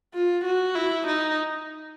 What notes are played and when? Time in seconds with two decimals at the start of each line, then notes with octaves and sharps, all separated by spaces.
0.15 F4
0.45 F#4
0.76 E4
1.07 D#4